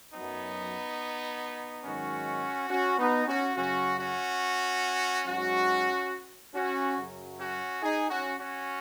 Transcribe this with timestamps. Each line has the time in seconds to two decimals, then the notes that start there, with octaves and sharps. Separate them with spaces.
0.14 F#2 F#3 B3 D#4
1.85 G#2 D#3 F#3 C#4 F#4
2.70 C#4 F#4
2.99 B3 D#4
3.27 C#4 F#4
3.55 F#2 C#3 F#3 C#4 F#4
3.99 C#4 F#4
5.26 G#2 F#3 C#4 F#4
6.54 C#4 F#4
6.98 F#2 C#3 F#3
7.39 C#4 F#4
7.82 D#4 G#4
8.10 C#4 F#4
8.39 C#4 F#4